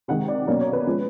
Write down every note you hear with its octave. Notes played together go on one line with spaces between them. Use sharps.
C3 D#3 G#3 F#5
D5
B2 F#3 A#3 C#4 D5
C#5
B4
F3 G#3 C#4